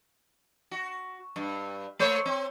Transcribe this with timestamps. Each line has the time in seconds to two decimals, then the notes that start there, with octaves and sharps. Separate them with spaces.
0.71 F#4
1.36 G2
1.99 A3 C5 C#5
2.26 C4